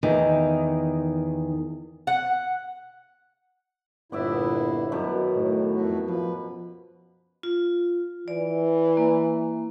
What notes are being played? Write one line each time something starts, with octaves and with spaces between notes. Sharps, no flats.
E2 D#3
F#5
G1 A#2 B3 E4 D5 E5
F#2 B2 D#3 B5
A2
F2 A3 F#4
F3 B4
F4
E3 D5
A#3